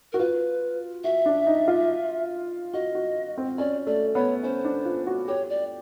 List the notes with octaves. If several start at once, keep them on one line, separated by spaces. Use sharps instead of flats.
F#4 A#4
F4 B4
F#4 E5
D4
D#4
F4
F#4 D#5
F#4
C4
C#4 D5
A3 D5
B3 C#5
C#4 C5
D4
F4
F#4
G4 C#5
D5